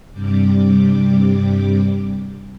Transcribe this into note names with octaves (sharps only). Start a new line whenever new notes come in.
G2 C3 G3 D6